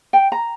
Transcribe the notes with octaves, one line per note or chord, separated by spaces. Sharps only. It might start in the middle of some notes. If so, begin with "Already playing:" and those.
G5
A#5